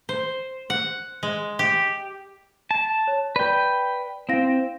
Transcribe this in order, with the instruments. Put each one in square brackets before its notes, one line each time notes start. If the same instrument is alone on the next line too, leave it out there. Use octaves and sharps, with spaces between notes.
[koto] C5
F#5
G#3
G4
[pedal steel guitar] A5
[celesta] C#5
[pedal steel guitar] B4 G5 [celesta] D5
[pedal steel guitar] C4 [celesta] E4 F5 A#6